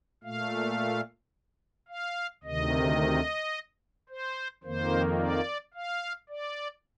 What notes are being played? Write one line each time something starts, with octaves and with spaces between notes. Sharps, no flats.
A#2 A3 F5
F5
D2 C3 D#3 D#5
C5
F2 D#3 A#3 C5
D5
F5
D5